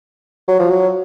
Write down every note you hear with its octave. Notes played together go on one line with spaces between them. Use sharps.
F#3
F3
F#3